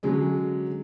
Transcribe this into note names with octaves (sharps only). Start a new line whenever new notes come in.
D3 F#3 G#3 C#4